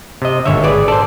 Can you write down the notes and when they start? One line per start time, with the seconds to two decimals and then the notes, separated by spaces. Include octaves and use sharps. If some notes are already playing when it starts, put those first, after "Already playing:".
0.22 C3 D#5
0.45 G#1 A#2 D3 C#5 E5
0.64 G#4 B4 D5
0.88 A4 C5 D5